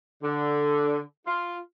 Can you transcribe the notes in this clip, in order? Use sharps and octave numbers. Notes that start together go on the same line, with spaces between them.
D3
F4